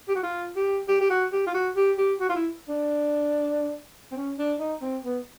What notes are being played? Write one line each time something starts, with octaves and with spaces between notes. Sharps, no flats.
G4
F#4
F4
G4
G4
G4
F#4
G4
F4
F#4
G4
G4
F#4
F4
E4
D4
C4
C#4
D4
D#4
C4
B3